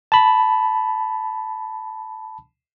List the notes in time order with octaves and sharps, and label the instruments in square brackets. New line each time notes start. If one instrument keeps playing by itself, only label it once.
[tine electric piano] A5 B5